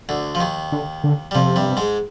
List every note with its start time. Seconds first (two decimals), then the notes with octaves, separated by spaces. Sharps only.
0.09 D2 D3
0.35 F3
0.40 D#2 D#3
0.72 D3
1.04 D3
1.31 G3
1.35 F2 C3 F3
1.56 G2 G3
1.77 G#2 G#3